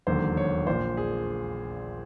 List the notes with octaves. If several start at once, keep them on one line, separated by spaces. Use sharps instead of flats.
E1 D#2 D3 F#3 C5
C#5
A#1 A#2 F3 C5
G#4